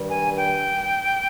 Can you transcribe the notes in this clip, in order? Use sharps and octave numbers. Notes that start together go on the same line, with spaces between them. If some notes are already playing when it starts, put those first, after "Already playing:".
Already playing: G2 D#3 G3
G#5
G5